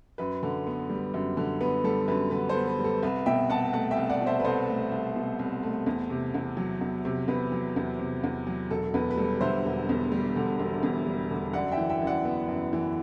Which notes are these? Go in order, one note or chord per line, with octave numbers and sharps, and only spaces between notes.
F#2 B4
D3
B3
G3
F#2
D3
B3 B4
G3 A4
F#2 B4
D3 B4
A4 C5
B3
B4
G3
A4
C2 B4
B2 E5 G5
C2 F#5 A5
A3 F#5 A5
E5 G5
C2
D5 F#5
B2
C5 E5
B4
C2 A4 C5
A3
C2
B2
C2
A3
E2
C3
E2
F#3
E2
C3
E2 B4
F#3
E2
C3
E2
F#3
E1 A4
E2 B4
B4
G3 A4
D3 C5 E5
E1
E2
G3
D3
E1
E2
G3
D3
F#2 D5 F#5
E5 G5
E3
E5 G5
F#2
D5 F#5
B3
F#2
E3